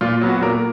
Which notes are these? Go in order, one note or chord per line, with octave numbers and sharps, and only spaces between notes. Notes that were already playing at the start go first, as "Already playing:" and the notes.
A#2 F4
F#3 B3
F#4
A#2 A#4